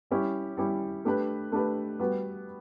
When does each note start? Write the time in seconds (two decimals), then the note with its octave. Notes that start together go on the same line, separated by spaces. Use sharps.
0.11 G3 C#4 E4 G4
0.57 G3 C#4 E4 G4
1.05 A3 D4 G4 B4
1.52 A3 D4 G4 B4
1.99 G3 B3 F#4 B4